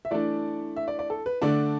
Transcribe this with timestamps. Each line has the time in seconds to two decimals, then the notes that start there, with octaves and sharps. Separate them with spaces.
0.05 E5
0.11 E3 A3 D4 D5
0.77 E5
0.88 D5
0.99 D5
1.10 A4
1.26 B4
1.42 D3 A3 D4 D5